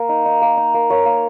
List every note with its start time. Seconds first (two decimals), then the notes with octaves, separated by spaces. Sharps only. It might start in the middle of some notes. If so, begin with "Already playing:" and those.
Already playing: A#3
0.09 D#4
0.26 D#4
0.42 A#3
0.57 D#4
0.74 A#3
0.90 A#3 C#5
1.06 A#3